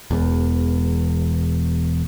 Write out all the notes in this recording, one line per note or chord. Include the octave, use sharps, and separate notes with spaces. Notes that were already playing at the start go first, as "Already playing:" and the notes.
E1 E2